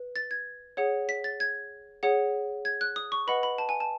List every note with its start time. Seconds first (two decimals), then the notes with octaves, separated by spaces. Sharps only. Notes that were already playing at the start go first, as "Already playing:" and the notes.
Already playing: B4
0.16 A6
0.31 G#6
0.77 G#4 C#5 F#5
1.09 B6
1.24 A6
1.40 G#6
2.03 G#4 C#5 F#5
2.65 G#6
2.81 F#6
2.96 D#6
3.12 C#6
3.27 B4 D#5 F#5 B5
3.43 B5
3.58 A5
3.69 G#5
3.80 A5